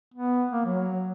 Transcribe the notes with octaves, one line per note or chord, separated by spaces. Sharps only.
B3
A#3
F#3